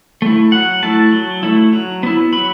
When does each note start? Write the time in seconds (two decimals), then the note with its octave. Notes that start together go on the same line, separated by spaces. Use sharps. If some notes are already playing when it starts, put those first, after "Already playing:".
0.22 A3 E4
0.52 F#3 F#5
0.82 A3 E4 A5
1.13 F#3
1.43 A3 E4
1.73 F#3
2.03 B3 E4
2.33 F#3 B5